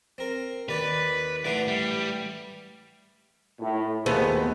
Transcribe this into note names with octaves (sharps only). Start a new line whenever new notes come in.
C4 A#4
D#2 B4 D5
A1 E4 B4 D5 F#5
G3
A2
D#2 B2 A3 B3 G#4 C5